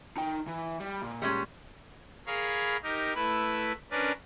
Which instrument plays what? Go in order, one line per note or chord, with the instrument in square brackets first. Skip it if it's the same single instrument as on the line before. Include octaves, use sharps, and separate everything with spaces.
[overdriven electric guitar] D#4 G5
E3
G3
A#2
[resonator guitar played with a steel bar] G3 G#3 C#4
[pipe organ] G#4 A#4 C#5 F5 B5
D#4 G4 A#4
A3 E4 B4 B5
C#4 D4 A#4 B4 D5